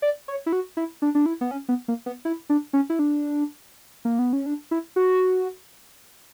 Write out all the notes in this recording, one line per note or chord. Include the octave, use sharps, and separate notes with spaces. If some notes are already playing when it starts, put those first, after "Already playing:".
D5
C#5
E4
F#4
E4
D4
D4
E4
B3
C#4
B3
A#3
B3
E4
D4
C#4
E4
D4
A#3
B3
C#4
D4
E4
F#4